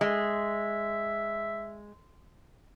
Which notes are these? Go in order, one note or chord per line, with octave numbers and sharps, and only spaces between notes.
G#3 E5